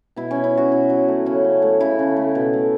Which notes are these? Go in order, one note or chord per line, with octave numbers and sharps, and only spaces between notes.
B2 E4
B2 C#4
E4
F#3 F#4
B2 E4
F#3
A3
C#3 C#4
A3
A3
C#3 E4
C#3
A3
B2
A3